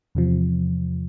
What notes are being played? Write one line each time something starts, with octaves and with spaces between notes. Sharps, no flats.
E2 C3 F3